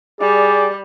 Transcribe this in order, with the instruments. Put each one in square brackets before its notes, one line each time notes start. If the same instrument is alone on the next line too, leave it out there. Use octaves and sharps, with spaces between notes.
[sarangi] G3 [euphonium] G#4 [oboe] D5